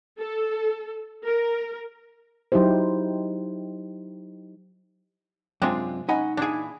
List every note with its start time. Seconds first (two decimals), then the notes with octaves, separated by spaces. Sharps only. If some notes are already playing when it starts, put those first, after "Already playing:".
0.19 A4
1.25 A#4
2.52 F#3 D#4 E4 G4 C5
5.62 F#2 C3 G#3 C4 D4 F4
6.09 C#4 D#4 D#5 F#5 G#5 B5
6.37 A#2 E3 D4 G#4